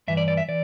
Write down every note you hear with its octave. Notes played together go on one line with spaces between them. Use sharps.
G2 E3 E5
D5
D5
E5
E3 D5